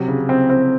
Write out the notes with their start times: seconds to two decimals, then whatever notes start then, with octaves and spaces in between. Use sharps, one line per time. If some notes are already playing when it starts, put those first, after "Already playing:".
Already playing: C3 F#3
0.08 C#3
0.29 C4
0.50 C4